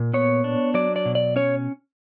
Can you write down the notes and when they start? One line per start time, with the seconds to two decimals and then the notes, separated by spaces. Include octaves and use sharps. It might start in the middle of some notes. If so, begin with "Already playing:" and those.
Already playing: A#2
0.13 B3 C#5
0.44 D4
0.74 F#3 D5
0.96 D5
1.06 B2
1.15 D5
1.36 C#4 C#5